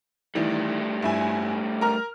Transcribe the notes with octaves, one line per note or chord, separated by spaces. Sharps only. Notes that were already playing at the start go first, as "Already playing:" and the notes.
A2 D#3 E3 G3
G2 E4 G#5
A#4 A#5 F6